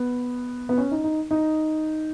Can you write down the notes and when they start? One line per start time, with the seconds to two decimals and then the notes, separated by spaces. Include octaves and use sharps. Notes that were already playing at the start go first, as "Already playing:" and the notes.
Already playing: B3
0.69 B3
0.78 C#4
0.91 D#4
1.04 D#4
1.31 D#4